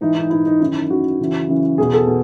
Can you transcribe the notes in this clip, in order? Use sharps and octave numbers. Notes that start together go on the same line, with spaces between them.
G#2 E3 D#4
D#4
G#2 E3 E4
D#4
F#2 D#3 E4
F#2 D#3 F#4
F#2 C#3 E3
F#2 C#3 E3
E2 B2 G#4
A4
B2